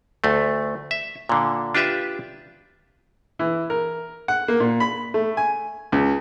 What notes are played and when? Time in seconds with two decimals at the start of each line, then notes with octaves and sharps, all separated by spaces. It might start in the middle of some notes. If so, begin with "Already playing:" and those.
0.24 D2 A3
0.91 E5
1.29 A#2 D3
1.75 D4 F4 G4 B4 E5
3.39 E3
3.70 A#4
4.28 F#5
4.48 A#3
4.60 A#2
4.80 B5
5.14 A3
5.37 G#5
5.92 C#2